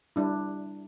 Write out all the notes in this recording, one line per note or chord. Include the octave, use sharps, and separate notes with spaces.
G3 D4 E4